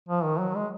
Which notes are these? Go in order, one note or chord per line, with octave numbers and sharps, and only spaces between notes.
F3
D#3
F#3
G#3